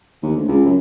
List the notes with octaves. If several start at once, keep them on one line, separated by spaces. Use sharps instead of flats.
D#2
D2
C#2
F#2